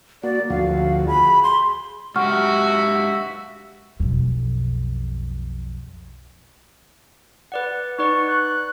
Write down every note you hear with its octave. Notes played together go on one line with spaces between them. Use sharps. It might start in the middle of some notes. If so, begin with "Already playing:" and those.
A#3 F#4 D5
D2 F3 F#4 F5
G#4 B5
C6
G#2 F#4 G4 E5 F#5 C#6 F6
B1 F2
B4 D5 F#5
D#4 B4 D5 C#6
F#6